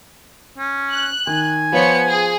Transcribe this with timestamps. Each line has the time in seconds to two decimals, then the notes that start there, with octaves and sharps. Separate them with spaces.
0.58 C#4
0.92 F#6
1.27 D#3 G#5
1.72 F3 B3 F4 C5 C#5 C#7
2.05 G#4